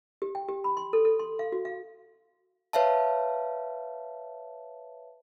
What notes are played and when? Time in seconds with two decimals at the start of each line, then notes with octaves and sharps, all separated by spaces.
0.22 G4
0.35 G5
0.48 G4
0.64 B5
0.77 C6
0.93 A4
1.05 A4
1.19 C6
1.39 F5
1.52 F#4
1.65 F5
2.73 B4 C#5 E5 F5 A5